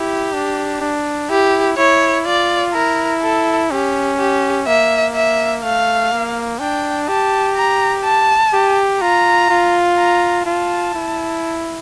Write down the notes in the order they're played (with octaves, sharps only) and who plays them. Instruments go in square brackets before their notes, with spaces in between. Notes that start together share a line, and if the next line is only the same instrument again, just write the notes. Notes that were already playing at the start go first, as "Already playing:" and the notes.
Already playing: [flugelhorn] E4 [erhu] G4
[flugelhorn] D4
D4
[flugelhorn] E4 [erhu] G4
[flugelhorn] E4 [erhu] C#5
[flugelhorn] F4 [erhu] D5
[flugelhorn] E4 [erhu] A#4
[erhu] A4
[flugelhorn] C#4 [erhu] G4
[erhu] G4
[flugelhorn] A#3 [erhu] E5
[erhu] E5
[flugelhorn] A3 [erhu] F5
[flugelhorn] A#3
[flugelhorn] D4 [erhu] G5
[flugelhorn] G4 [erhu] A5
[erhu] A#5
A5
[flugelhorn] G4
[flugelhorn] F4 [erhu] A#5
[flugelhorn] F4
[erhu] A#5
[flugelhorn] F4 [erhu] A5
[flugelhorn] E4